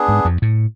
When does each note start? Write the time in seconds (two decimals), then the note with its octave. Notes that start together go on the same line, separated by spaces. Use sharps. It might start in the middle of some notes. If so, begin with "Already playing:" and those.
Already playing: B3 D4 G#4
0.08 G#2
0.25 F2
0.42 A2